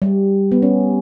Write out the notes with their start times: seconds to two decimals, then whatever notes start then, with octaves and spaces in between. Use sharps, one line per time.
0.02 G3
0.52 B3
0.62 C#4